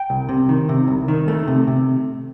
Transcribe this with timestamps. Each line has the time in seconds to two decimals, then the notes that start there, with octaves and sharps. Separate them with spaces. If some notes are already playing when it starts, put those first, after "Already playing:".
Already playing: G5
0.10 C2
0.29 C3
0.49 D#3
0.69 C3
0.88 C2
1.08 D#3
1.28 A3
1.48 C3
1.67 C3